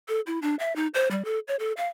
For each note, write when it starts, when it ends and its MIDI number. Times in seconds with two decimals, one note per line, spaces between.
0.08 0.21 69
0.27 0.39 64
0.42 0.55 62
0.59 0.75 76
0.76 0.87 63
0.94 1.08 72
1.11 1.24 55
1.25 1.39 69
1.48 1.56 73
1.59 1.72 69
1.77 1.88 77